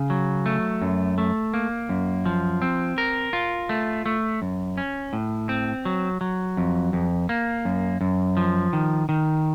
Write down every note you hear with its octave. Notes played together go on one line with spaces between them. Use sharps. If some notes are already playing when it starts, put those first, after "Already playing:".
Already playing: C#3
F#3
A3
F#2
A3
A#3
F#2
F3
C4
A#4
F4
A3
A3
F#2
C#4
A2
C4
F#3
F#3
F2
F2
A#3
F#2
F#2
F3
D#3
D#3